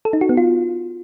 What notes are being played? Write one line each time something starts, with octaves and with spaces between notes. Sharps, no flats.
A4
D#4
F#4
B3
F4